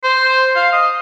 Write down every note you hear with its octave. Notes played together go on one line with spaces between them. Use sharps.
C5
F5
D#5